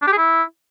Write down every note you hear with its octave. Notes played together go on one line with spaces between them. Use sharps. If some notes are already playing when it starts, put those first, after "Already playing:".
D4
G4
G#4
E4